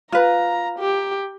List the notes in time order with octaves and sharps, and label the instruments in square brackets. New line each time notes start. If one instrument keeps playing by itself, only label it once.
[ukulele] F4 B4 [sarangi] A#5
[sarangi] G4